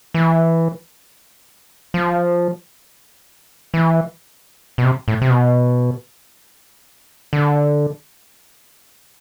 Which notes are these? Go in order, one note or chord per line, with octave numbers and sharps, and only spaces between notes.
E3
F3
E3
B2
C3
A2
C3
B2
D3